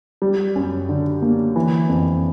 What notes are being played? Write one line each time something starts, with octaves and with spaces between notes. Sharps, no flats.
G3
F#2
D3
A#3
E3
F2